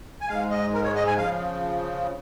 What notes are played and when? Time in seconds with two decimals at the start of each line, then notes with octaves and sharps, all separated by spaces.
0.21 G#5
0.29 G#2 G#3 F5
0.50 D#5
0.73 A#4
0.84 C#5
0.96 D#5
1.07 G#5
1.17 C#3 F3 F5